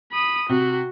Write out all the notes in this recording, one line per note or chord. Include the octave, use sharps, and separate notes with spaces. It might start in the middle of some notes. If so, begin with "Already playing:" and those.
B5 D#6
C3 F#4